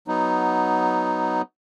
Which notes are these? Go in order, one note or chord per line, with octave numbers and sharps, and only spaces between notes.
F#3 B3 D#4